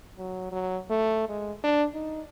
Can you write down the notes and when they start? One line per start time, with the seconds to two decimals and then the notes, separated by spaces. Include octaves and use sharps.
0.18 F#3
0.52 F#3
0.90 A3
1.29 G#3
1.64 D4
1.95 D#4